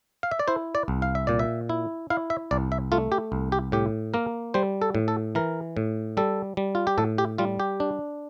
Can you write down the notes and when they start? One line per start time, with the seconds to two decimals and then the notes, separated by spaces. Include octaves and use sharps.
0.23 F5
0.31 E5
0.39 D5
0.48 E4 C5
0.75 D5
0.88 C2
1.02 F5
1.15 E5
1.27 A#2 D5
1.39 E5
1.69 E4
2.10 E4 F5
2.30 E5
2.51 C2 D5
2.72 E5
2.92 A3 F4
3.12 G4
3.32 C2
3.52 G4
3.72 A2 G4
4.14 A#3 A#4
4.54 G3 C5
4.82 A4
4.95 A2
5.08 A4
5.35 E3 A#4
5.77 A2
6.17 G3 A4
6.57 G3
6.75 F4
6.87 G4
6.98 A2 A4
7.18 G4
7.38 G3 F4
7.60 G4
7.80 D4